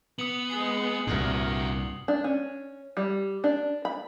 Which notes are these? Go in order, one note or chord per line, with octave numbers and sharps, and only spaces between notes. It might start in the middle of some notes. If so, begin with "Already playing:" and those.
B3 D#6 C#7 F#7
G#3 G#4 C7 F#7
C2 G2 A#2 D4 F#4 A#4
D4
C#4
G3
D4
B5